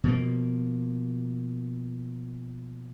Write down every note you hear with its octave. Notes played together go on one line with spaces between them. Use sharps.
B2 F3 A#3